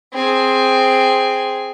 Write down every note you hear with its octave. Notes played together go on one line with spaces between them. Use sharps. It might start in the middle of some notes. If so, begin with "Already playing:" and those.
C4 G#4